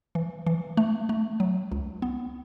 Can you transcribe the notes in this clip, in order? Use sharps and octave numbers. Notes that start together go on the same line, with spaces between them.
E3
E3
A3
A3
F#3
C#2
B3